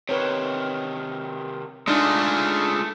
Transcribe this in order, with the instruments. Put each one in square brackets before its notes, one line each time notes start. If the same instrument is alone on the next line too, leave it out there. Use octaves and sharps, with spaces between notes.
[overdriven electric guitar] C3 D#3 [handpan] B4 C#5
[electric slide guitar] G#3 F4 G#4 [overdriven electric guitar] A3 [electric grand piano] D4 [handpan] D#4